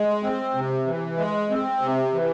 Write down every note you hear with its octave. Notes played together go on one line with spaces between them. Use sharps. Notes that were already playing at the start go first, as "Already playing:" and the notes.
Already playing: G#3
C4
C3
E3
G#3
C4
C3
E3